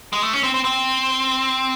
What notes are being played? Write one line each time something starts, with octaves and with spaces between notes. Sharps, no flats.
G#3
A3
C#4
C4
C4
C4